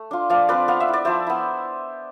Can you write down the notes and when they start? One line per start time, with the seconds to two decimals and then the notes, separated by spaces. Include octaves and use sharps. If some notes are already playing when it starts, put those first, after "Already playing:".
Already playing: A3
0.11 D4 F4
0.29 F3 D5 F5
0.49 C4 F4 B4 D5
0.68 B3 F5
0.80 E5
0.88 E4
0.93 D5
1.05 F3 C5 E5
1.27 B3 E4